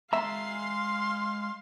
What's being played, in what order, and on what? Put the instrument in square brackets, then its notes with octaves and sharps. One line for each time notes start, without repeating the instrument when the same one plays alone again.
[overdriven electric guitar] G#3 A5 [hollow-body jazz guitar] E5 A#5 [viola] F5 [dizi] C6